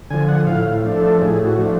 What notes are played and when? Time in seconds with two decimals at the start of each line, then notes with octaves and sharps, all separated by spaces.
0.10 D3 F3 G#5
0.29 F#5
0.47 A2 F5
0.84 F3 A3 D4
0.96 A4
1.21 A2 G#4
1.45 F#4
1.58 F3 A3 D4